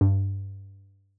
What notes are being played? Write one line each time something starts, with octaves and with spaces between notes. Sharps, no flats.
G2